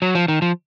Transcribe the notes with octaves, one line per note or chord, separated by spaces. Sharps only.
F#3
F3
D#3
F3